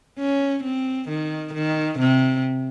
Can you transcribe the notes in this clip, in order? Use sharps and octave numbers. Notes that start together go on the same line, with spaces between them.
C#4
C4
D#3
D#3
C3